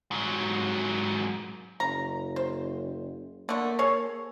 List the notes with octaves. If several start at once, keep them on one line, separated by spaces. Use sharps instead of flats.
G#2 F#3
F#1 A#5
C5
D3 A3 A#3
G#4 A4 C#5